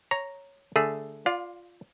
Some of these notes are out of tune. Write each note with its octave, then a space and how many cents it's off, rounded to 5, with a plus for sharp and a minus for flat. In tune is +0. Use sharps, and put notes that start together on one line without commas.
C#5 +0 A#5 +0
D3 +0 A3 +0 G#4 +5
F4 +0 D5 +0 F5 +30